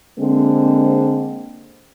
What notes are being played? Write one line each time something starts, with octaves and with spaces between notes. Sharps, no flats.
D3 G#3 A#3 C4